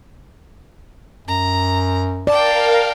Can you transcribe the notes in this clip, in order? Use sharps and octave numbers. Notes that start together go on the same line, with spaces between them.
F#2 A#5
A#4 D5 F5 G5 A5